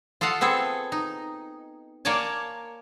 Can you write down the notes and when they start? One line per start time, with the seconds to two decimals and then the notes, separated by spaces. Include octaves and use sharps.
0.21 F4 A4 D#5 F5 F#5
0.41 B3 C4 G#4 A4
0.92 D#4
2.05 A#3 A#4 C#5 D5 G#5 A5